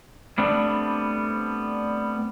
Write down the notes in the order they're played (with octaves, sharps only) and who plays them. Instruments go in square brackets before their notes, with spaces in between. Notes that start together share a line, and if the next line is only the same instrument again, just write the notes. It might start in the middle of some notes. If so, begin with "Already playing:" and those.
[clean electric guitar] G3 A3 B3 C4 D4